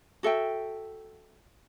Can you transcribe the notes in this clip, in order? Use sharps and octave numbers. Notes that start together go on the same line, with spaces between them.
F#4 A4 E5 G5